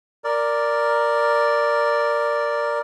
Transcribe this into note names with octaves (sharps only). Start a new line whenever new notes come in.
A#4 D5